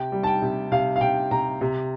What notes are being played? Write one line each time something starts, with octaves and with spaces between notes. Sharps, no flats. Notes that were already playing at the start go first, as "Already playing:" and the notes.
Already playing: C3 G5
G3
A5
G5
C3
C3 F5
F5
C3 G5
C3 A#5
C3